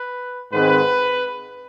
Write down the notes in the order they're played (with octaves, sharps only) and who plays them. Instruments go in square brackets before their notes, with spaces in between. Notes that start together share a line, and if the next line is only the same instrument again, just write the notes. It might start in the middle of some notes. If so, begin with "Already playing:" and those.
Already playing: [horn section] B4
G#2 D#3 G#3 C4 B4